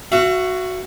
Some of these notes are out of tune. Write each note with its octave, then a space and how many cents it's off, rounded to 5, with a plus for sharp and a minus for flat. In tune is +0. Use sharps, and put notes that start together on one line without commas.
F#4 +0 E5 +40